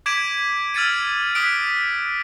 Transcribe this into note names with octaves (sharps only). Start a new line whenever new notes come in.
D6 G#6 B6 D7 E7 F#7
E6 F6 G#6 A6 C#7 D#7
D#6 F#6 B6 D7